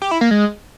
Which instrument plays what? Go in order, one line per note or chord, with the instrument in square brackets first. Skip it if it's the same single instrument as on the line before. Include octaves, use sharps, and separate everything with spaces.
[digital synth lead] G4
E4
A#3
G#3